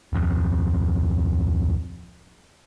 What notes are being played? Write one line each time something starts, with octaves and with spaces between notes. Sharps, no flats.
D1 F2